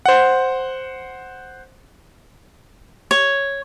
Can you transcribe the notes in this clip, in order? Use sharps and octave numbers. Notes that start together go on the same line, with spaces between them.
C5 F#5
C#5